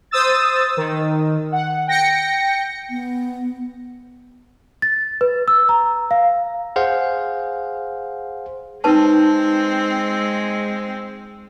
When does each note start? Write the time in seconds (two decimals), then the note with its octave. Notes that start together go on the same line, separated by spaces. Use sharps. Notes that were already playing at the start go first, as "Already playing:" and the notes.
0.11 C5 D#6 E6 A6
0.77 D#3
1.52 F#5
1.87 G5 A#6 C#7
2.90 B3
4.82 A6
5.21 B4
5.48 E6
5.69 A#5
6.11 F5
6.76 G#4 C5 F5 F#5
8.84 G#3 C4 D#4 B4 A5